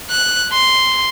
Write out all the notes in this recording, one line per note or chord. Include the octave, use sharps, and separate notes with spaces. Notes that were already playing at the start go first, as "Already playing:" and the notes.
F#6
C6